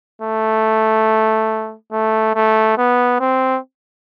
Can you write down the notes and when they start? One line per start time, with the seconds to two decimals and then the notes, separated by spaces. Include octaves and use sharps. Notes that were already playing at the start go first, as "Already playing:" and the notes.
0.22 A3
1.92 A3
2.35 A3
2.78 B3
3.20 C4